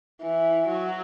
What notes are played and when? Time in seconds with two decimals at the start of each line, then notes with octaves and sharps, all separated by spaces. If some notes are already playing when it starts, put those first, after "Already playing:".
0.22 E3
0.68 F#3